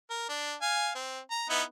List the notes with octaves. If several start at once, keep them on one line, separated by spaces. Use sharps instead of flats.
A#4
D4
F5 G#5
C4
A#5
B3 D#4 E4